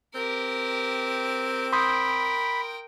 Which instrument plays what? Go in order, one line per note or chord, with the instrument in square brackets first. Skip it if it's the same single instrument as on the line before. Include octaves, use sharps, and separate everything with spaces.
[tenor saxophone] C4 [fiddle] G4 A#4
[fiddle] A#4 G5 [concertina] B5 [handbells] C6 D#6 G6